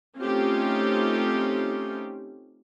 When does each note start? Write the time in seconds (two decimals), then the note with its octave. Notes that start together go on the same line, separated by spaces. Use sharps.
0.18 A3 C4 C#4 D#4 F4 G4